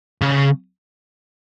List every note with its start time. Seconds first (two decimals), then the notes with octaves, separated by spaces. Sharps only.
0.22 C#3